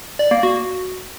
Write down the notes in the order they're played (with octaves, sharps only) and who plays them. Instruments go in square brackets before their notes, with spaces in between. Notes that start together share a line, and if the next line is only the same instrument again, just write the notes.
[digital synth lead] D5
A#3
F#4